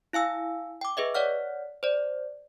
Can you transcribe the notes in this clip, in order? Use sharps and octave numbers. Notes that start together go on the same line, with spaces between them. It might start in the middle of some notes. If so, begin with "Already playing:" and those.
E4 F5 G#5 E6
G5 D6
G#4 B4 D#5 E5
C#5 D5 F#5 F6
C5 D5